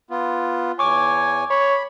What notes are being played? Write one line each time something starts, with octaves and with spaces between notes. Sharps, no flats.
B3 F4
E2 C#5 G#5 C#6 D6
C#5 B5